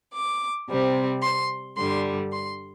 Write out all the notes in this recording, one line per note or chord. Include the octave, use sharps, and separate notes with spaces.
D6
C3 G3 C4
C6
G2 D3 G3 C6
C6